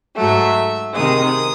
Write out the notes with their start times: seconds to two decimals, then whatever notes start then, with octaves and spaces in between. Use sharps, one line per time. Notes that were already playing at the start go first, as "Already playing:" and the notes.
0.16 G#2 F#3 A3 E5
0.94 C3 D#3 G#3 D#6